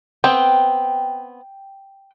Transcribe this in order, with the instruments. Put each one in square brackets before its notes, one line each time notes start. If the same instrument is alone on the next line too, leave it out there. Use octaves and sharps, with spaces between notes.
[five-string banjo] B3 C4 [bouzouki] G5